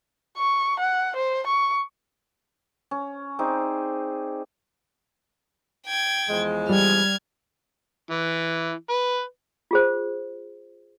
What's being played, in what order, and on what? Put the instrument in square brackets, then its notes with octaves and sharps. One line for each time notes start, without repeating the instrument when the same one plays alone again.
[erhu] C#6
F#5
C5
C#6
[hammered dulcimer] C#4
C4 D#4 G#4 D5
[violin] G5 G#6
[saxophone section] E2 F3 G#3
[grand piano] G3 [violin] F6 G#6
[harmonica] E3
B4
[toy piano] F4 G#4 C5